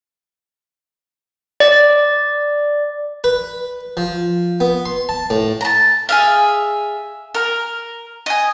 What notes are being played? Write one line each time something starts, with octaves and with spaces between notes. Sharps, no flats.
D5
B4
F3
B3
C6
A5
A2
A5 A#5
G#4 E5 F5
A#4
D#5 G#5